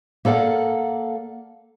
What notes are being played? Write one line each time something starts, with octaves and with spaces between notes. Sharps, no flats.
A#3 A4 D5 F5 F#5